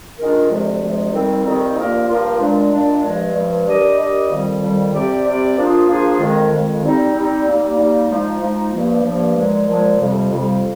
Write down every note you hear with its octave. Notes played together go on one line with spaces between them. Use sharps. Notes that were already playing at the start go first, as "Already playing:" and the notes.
D#3 G#3 D4 F4 A#4
D2 C3 F3 G#3
D2 C3 F3 G#3
F2 D#3 G3 C4 D#4
F2 D#3 G3 C4 D#4
G2 F3 A#3 F4 A#4
G2 F3 A#3 F4 A#4
A#2 G#3 D4
A#2 G#3 D4
G2 F3 G#3
G2 F3 G#3
G3 D4 G4 A#4 D#5
G3 D4 G4 A#4 D#5
F2 D#3 G3
F2 D#3 G3
C3 G3 C4 G4 D5
C3 G3 C4 G4 D5
F3 A#3 D4 F4 G#4
F3 A#3 D4 F4 G#4
F2 D#3 G#3
F2 D#3 G#3
G3 C4 D#4
G3 C4 D#4
G3 A#3 D#4
G3 A#3 D#4
F3 G#3 D#4
F3 G#3 D#4
G2 F3 A#3
G2 F3 A#3
A#2 F3 G#3
A#2 F3 G#3
F2 C3 G3
F2 C3 G3